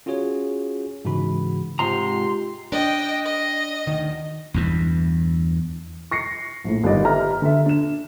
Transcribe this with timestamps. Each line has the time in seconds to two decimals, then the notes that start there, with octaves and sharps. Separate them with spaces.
0.06 C#4 F4 F#4 G#4 C#5
1.05 G#2 C#3 E3 F#4 B5
1.79 G#2 C3 F4 G4 A#5 C6
2.72 D4 D#5 G5
3.25 D#5
3.86 D2 D#3
4.54 E2 G2 E3
6.11 C#6 A#6 C7 C#7
6.64 A#1 A2
6.83 G1 G2 D#3 G4 D5 D#5
7.03 G4 A4 B4 E5 A#5 F6
7.42 D3 A4 E5
7.66 D4 E7